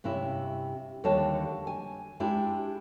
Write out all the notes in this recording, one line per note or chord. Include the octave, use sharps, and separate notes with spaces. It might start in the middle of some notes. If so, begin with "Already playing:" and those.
G2 C3 C#4 E4
D#2 D3 G3 C#5 D#5 A5
G#5
G#3 D4 E4 G4